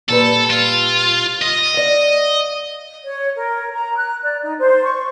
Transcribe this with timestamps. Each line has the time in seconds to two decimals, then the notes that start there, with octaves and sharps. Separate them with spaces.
0.09 A#2 G3 A4 B4
0.50 F4
1.42 D#5
1.74 D5 F5
3.04 C#5
3.36 A#4
3.74 A#5
3.97 F#6
4.23 D5
4.43 D#4
4.58 C5
4.84 C#6